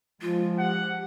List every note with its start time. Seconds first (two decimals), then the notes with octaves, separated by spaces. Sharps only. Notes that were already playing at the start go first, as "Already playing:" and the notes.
0.22 F3 G#3 F4
0.59 G4 F#5